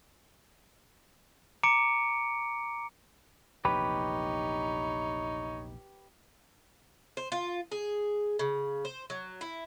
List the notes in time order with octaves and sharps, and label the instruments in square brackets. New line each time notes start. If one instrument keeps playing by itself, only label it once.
[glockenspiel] A#5 D6 C#7 D7
[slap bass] A#1 E2 C3 [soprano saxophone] D#4 [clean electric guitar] G4 B4 [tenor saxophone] C#5
[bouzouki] C5
F4
G#4
C#3
C5
F#3
E4